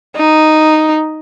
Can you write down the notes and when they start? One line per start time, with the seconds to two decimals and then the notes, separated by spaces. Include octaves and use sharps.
0.16 D#4